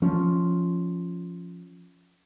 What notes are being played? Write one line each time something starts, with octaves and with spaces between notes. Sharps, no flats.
F3 C#4